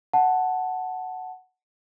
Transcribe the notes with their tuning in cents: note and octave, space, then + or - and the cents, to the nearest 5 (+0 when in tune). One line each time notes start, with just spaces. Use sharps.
F#5 +0 A5 +0